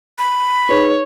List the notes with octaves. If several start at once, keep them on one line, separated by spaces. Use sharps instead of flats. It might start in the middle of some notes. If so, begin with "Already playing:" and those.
B5
D#4 G#4 B4 C#5